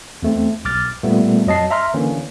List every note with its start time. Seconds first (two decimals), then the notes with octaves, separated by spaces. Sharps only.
0.22 E2 A3 C4
0.65 B1 D6 F6 A6
1.03 A#2 G3 A3 B3
1.46 F2 F#3 D#5 A5 C7
1.71 E5 A#5 C6 F6
1.94 D3 E3 A#3 C#4